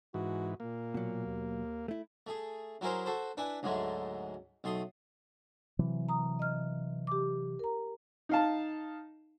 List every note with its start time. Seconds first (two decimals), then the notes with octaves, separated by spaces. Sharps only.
0.14 G#2 E3 F#4
0.60 A#2 A#3
0.94 B2 F#3
1.26 D#2
1.88 A3 E4
2.27 A3 G#4
2.81 F#3 E4 G#4 A#4 C5
3.06 F#4 A4 C5
3.37 D4 E4 B4 G#5
3.63 D2 G#2 F#3 G#3 A3
4.64 B1 A3 C6 D#6
5.79 C3 E3 F#3
6.09 A#5 D#6
6.39 D#5 F6
7.07 G4 D6
7.59 A#4 A#5
8.29 D#4 F5 A5